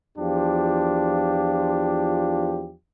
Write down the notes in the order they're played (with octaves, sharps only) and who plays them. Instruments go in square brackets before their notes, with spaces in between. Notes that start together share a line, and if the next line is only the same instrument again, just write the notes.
[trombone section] E2 F3 D4 F4 G4